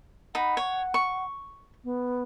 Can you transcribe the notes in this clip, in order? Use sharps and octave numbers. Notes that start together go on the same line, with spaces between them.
D#4 F#5 B5
C#5
C#6
B3